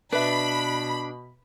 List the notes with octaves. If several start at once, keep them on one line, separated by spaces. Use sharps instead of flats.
B2 D4 B4 E5 B5